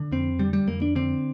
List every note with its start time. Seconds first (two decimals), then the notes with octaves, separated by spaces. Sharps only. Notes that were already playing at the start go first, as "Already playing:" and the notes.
Already playing: D3
0.12 F2 C4
0.39 D3 G3
0.53 G3
0.67 F2 A#3
0.82 D4
0.96 D3 C4